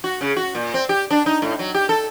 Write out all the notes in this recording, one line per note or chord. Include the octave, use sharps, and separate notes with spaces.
F#4
C#3
F#4
A#2
C4
G4
D4
D#4
A2
F#3
G4
A4